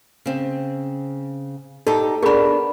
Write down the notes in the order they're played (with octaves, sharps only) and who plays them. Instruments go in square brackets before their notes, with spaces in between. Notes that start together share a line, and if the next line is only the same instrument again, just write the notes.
[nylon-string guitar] C#3 C4
[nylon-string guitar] D#4 G4 [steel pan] A4
[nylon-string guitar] B3 D4 [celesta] G#4 B5 [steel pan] A#4